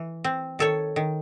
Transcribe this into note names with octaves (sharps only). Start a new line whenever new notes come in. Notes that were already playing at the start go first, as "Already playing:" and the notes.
Already playing: E3
C4
D#3 A4 C#5
D#3